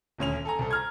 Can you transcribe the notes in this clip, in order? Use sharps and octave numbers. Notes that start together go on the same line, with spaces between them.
D#1 D2 C#4 F7
A4 G#5 A#5
C2 C4 A4
A#5 F6 G#6